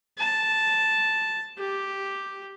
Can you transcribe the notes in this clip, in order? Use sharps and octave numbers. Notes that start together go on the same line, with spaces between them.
A5
G4